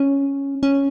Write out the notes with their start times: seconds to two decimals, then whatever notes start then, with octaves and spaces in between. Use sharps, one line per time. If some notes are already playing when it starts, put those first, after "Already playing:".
Already playing: C#4
0.63 C#4